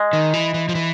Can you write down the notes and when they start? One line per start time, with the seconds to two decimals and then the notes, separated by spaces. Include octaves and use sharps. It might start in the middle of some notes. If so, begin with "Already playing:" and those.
Already playing: G#3
0.13 D#3
0.34 E3
0.54 E3
0.69 F3
0.75 E3